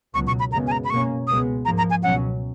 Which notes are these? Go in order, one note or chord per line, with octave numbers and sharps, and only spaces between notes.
C#2 B2 F#3 C#6
C#6
B5
F#2 C#3 G#3 B3 A#5
G#5
A#5
B5
B2 A#3 C#4 C#6
C#2 B2 G#3 B3 D#6
G#2 F3 A#3 A#5
A#5
G#5
C#2 B2 F#3 C#4 F#5